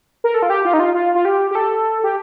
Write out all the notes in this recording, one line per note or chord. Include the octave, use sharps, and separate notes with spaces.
A#4
A4
F4
G4
F4
D#4
F4
F4
F4
G4
G4
A4
G4